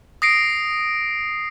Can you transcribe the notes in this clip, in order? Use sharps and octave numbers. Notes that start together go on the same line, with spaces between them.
D#6 A#6 C7 D7